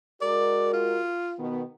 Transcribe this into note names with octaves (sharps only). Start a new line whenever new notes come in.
G#3 F#4 A#4 D5
F4
B2 D#3 B3